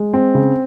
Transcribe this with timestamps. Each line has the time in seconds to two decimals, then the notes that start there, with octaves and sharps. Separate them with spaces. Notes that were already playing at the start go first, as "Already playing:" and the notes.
Already playing: G#3
0.13 C4
0.35 C#3